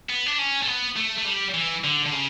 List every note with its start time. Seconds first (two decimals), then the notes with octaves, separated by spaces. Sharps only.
0.09 B3
0.26 D4
0.38 C#4
0.63 A3
0.68 B3
0.97 A3
1.18 A3
1.26 G3
1.54 E3
1.84 D3
2.06 D3
2.12 C#3